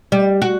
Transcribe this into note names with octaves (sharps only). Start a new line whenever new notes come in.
G3
F#4